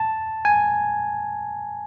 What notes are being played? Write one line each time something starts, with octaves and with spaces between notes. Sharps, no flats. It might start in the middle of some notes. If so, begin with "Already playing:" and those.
Already playing: A5
G#5